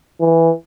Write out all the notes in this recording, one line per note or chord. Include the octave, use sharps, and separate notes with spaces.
E3